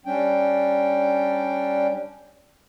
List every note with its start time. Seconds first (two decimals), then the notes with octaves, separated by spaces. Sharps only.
0.06 G3 C#4 D4 G5